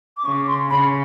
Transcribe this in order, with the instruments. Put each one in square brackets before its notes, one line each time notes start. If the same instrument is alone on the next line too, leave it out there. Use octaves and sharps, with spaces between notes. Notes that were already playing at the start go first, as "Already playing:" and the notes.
[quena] D6
[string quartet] C#3 [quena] C#6
[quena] C6
[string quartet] C#3 [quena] B5